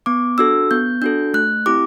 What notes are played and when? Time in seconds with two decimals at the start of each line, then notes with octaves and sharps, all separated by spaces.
0.06 B3 D6
0.38 D4 F#4 A4 E6
0.71 B3 G6
1.02 D4 F#4 A4 G6
1.34 A3 F#6
1.66 C4 E4 G4 D6